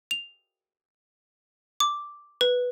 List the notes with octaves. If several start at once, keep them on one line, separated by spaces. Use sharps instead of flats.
F7
D6
B4